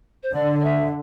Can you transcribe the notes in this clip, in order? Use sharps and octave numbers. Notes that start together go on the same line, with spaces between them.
C5
D3 D5
D5
E5